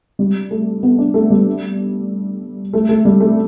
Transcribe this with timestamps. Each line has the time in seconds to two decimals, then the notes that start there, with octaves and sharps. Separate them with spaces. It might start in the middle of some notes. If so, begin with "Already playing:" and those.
0.19 G3
0.51 A3
0.83 B3
0.98 D4
1.14 A3
1.30 G3
2.73 A3
2.89 A3
3.05 G3
3.20 A3